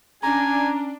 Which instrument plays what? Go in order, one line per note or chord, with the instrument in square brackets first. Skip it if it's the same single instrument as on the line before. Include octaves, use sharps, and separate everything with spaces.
[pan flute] C#4 [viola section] D4 [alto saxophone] G#5 [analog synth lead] A#5